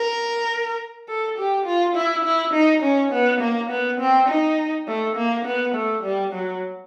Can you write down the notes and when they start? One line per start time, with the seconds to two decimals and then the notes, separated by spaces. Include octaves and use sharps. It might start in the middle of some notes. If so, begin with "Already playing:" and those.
Already playing: A#4
1.09 A4
1.38 G4
1.66 F4
1.96 E4
2.25 E4
2.54 D#4
2.83 C#4
3.12 B3
3.41 A#3
3.70 B3
4.00 C4
4.29 D#4
4.87 A3
5.16 A#3
5.45 B3
5.75 A3
6.04 G3
6.33 F#3